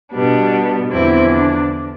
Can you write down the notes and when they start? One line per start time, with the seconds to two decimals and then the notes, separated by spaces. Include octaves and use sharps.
0.13 B2 G3 B3 D4
0.92 E2 D3 F3 C4 E4
1.31 D4